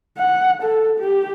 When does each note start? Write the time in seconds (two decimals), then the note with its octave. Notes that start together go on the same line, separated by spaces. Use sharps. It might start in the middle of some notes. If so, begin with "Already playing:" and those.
0.18 F#5
0.63 A4
1.00 G4